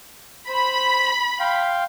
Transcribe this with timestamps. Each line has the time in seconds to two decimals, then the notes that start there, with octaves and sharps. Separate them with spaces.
0.48 C5 B5
1.40 F5 G5 C6